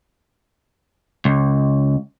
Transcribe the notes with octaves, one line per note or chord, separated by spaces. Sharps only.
C#2